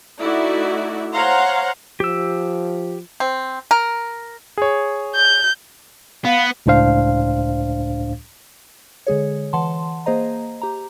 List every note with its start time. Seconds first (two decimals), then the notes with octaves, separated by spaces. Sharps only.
0.21 A3 D#4 E4 F#4 D5 E5
1.13 C5 C#5 F5 F#5 A#5 C6
2.00 F3 G4 E6
3.20 C4
3.71 A#4
4.58 G#4 C#5
5.15 G6
6.25 B3 F5
6.66 C#2 A2 D4 C5 F5
9.07 D3 G#3 G#4 C#5
9.53 E3 F#5 A5 C6
10.06 A#3 G#4 C5 D#5 A#5
10.61 G4 A#5